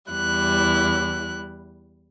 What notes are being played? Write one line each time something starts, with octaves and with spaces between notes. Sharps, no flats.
E2 G3 E4 F#6